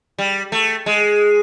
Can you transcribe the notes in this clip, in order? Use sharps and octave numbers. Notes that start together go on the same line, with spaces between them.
G3
A3
G#3